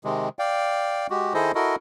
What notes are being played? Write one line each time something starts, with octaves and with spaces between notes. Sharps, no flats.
C3 D#3 G#3
D5 F5 G5
G#3 F#4 G4
D#3 E4 G#4 A4 C5 D#5
E4 F#4 A4 A#4 D#5